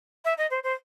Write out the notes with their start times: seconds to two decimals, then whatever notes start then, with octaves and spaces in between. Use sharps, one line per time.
0.25 E5
0.38 D#5
0.50 C5
0.63 C5